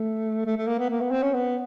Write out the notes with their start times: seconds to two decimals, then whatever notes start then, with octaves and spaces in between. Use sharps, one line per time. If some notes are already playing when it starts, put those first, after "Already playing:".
Already playing: A3
0.45 A3
0.57 A3
0.67 A#3
0.79 B3
0.90 A#3
1.01 B3
1.11 C4
1.22 C#4
1.34 B3